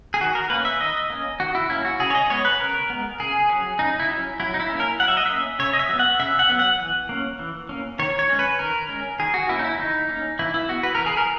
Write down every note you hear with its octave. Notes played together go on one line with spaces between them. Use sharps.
G#4
D#3 F#4
A#4
A#3 C#4 B4
E5
D#3 D#5
A#3 C#4
D#3 F#4
E4
A#3 C#4 E4
F#4
C#3 G#4
C#5
D#5
G#3 B3 C#5
B4
C#3 A#4
G#3 B3
C#3 G#4
F#3 C#4
C#3 D#4
E4
F#3 C#4
F#3 E4
D#4
E4
A#3 C#4
A#4
F#3 F#5
E5
D#5
A#3 C#4 E5
C#3 C#5
D#5
E5
F#3
B3
F#5
C#3 E5
F#5
F#3 B3
F#5
E3
A#3 C#4
E3
A#3 C#4
D#3 C#5
C#5
G#3 C#4
B4
D#3 A#4
G#3 C#4
D#3 G#4
F#4
A#3 C#4 E4
D#4
E4
D#3 D#4
A#3 C#4
E3 E4
E4
B3 F#4
B4
E3 A#4
G#4
A#4